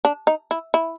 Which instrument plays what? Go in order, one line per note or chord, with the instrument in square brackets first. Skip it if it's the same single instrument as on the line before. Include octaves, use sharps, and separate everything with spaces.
[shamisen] D4
D#4
E4
E4